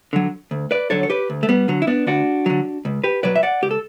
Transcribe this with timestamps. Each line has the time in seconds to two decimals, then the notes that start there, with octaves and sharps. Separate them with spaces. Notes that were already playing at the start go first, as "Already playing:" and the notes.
0.13 D3 F#3
0.51 D2
0.71 B4 D5
0.90 D3 F#3 A4 C#5
1.03 C#5
1.10 G4 B4
1.30 D2
1.43 A3
1.49 G3 B3
1.68 D3 F#3
1.82 E4
1.87 B3 D4
2.07 D2 D4 F#4
2.46 D3 F#3
2.85 C#2
3.04 G4 B4
3.23 B2 F#3 B4 D5
3.36 E5
3.43 D5 F#5
3.62 C#2 G4
3.71 A4